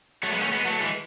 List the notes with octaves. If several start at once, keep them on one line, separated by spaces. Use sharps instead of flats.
F#3 A3
G#3 B3
A3 C#4
G#3 B3
F#3 A3
E3 G#3